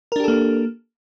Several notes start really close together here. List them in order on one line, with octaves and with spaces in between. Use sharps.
A#4 D4 G4 A4 A#3